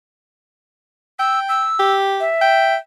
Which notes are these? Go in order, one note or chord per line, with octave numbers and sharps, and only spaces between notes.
G5 E6
E6
G4
E5
G5